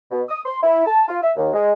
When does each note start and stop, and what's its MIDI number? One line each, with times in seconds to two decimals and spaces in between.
0.11 0.22 47
0.29 0.40 87
0.46 0.58 84
0.63 0.83 64
0.86 1.04 81
1.08 1.19 65
1.23 1.32 76
1.36 1.52 39
1.53 1.73 56